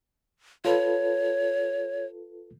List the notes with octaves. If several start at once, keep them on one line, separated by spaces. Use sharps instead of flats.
F4 A4 B4 C#5